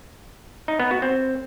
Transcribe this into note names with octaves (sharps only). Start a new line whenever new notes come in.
D#4
B3
F#4
C4